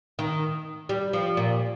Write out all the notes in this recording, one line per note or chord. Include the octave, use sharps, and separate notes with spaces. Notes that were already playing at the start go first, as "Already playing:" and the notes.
D#3
G3
F3
A#2